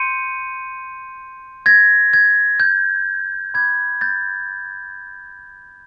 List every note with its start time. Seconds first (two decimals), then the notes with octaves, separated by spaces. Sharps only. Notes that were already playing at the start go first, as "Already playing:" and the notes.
Already playing: C6 G6 C#7 D#7
1.66 G#6 A#6
2.13 G#6
2.60 G6
3.54 B5 D6 F#6 G#6
4.01 G6 A6